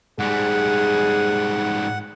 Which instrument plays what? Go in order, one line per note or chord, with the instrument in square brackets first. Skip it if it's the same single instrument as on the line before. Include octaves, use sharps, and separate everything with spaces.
[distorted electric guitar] G#2 G3 [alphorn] G#4 [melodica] F#5